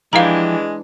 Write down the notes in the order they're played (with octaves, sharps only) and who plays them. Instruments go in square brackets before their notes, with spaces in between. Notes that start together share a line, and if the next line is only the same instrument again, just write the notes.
[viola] E3 D4 [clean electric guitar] F3 E4 G4 [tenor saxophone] G#3 [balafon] F5 A#5